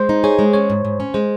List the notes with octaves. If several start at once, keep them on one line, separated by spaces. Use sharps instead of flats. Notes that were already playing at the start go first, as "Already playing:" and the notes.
Already playing: G#3 C5
D#4
G#4 C#5
G#3
C#4 C#5
G#2
G#2
C#4
G#3 C5